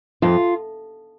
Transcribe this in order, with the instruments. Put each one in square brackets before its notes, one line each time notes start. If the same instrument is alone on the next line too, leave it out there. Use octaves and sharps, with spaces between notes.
[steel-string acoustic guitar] F2 F4